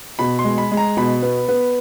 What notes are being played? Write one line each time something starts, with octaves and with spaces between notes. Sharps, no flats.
B2 B5
C6
G#3
B5
G#3
A#5
B2 B5
B3
B3